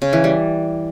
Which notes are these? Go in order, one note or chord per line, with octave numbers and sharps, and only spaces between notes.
C#3
E3
G3